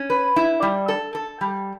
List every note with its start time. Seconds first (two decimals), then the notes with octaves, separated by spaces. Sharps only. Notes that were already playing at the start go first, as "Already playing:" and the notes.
Already playing: C#4
0.10 B4
0.36 E4
0.62 G3
0.88 A4
1.15 A4
1.41 G3